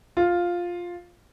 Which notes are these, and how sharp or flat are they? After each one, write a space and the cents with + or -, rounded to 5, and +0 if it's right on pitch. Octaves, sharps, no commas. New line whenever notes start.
F4 +5